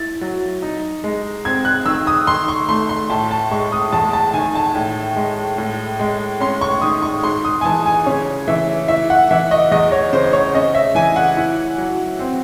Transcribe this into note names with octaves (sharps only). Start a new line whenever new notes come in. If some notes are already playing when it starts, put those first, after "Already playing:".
Already playing: E4 A6
F#3
D#4
G#3
C4 G#6
F#6
D#3 E6
D#6
D#3 C6
C#6
A3 C6
C6
A2 A5
A5
G#3 C#6
D#6
E2 A5
A5
D#3 G#5
A5
A2
G#3
A2
G#3
C#4 C6
C#6
D#3 D#6
C#6
G#2 C6
D#6
G#5
E3 A5
G#5
C#3 C#5
E3 E5
E4 E5
F#5
E3 E5
D#5
E2 D#5
C#5
C#3 C5
C#5
C#4 D#5
E5
E3 G#5
F#5
E4
F#3
C4